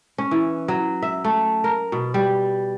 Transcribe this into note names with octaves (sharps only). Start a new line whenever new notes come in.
C#4
E3
F#3
E5
A3
A#4
B2
G3